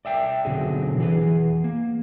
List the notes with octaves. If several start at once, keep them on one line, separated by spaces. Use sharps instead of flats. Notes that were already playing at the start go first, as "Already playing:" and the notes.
D5 E5 G5
B2 D3 F#3 C4 G#4
E3 G#4 B4
A#3